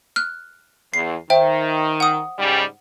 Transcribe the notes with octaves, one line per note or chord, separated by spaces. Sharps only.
F6 F#6
E2 C7
D#3 C5 E5 G5
F#5 D#6
G#2 C#3 G3